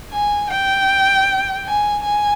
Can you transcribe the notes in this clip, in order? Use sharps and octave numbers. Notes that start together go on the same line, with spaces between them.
G#5
G5
G#5
G#5